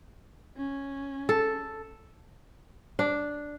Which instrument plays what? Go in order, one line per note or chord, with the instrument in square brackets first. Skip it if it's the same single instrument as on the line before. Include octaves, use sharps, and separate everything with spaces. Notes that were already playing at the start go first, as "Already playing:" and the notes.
[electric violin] C#4
[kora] A4
D4